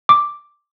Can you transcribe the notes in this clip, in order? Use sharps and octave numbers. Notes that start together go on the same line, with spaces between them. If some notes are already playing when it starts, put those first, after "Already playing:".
D6